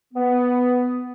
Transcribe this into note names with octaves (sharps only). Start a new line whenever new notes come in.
B3